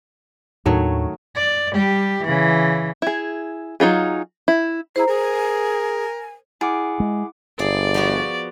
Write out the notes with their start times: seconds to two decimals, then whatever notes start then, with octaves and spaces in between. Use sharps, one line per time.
0.66 D#2 A2 D#3 F#3 A3 D4 C#5
1.36 D5
1.73 G3 G4
2.24 C#3 E3
3.02 E4 G#4
3.80 F#3 D#4 F4 G#4
4.48 E4
4.96 E4 G#4 C5 A#5
5.08 G#4 A#4 G#5
6.61 E4 G#4 F#5 D6
7.00 G#3
7.59 G1 G#4 D5
7.94 F3 B3 F#4